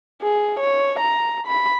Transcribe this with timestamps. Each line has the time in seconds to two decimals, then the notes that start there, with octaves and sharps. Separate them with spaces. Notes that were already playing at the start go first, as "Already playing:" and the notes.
0.22 G#4
0.60 C#5
1.00 A#5
1.47 B5